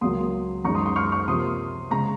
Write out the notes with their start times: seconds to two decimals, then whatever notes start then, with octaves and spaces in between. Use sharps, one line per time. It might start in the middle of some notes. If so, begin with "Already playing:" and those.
0.01 C#2 C#3 F#3 A#3 C6 D#6
0.64 F#2 D#3 G#3 A#5 C#6
0.75 C6 D#6
0.85 C6 D#6
0.96 C#6 F6
1.12 C#6 F6
1.28 C3 F3 A#3 C6 D#6
1.91 C#3 G#3 A#5 C#6